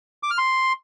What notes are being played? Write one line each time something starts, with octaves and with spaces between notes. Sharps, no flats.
D6
F6
C6